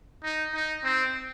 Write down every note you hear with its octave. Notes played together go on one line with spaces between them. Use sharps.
D#4
D#4
C4